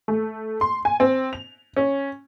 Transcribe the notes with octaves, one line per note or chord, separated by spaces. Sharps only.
A3
C6
G#5
C4
F7
C#4